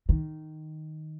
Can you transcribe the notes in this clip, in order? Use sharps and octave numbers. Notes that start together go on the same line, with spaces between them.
D#3